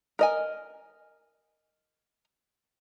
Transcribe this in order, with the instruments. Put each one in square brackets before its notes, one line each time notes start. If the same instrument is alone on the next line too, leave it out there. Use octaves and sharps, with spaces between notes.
[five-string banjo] A#4 D#5 G#5